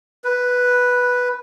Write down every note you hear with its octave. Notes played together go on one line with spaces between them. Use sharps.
B4